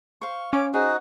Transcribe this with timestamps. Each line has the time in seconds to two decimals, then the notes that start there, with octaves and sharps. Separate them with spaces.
0.22 C5 F5 C#6
0.53 C#4 C#5 D6
0.74 D#4 F#4 G#4 C5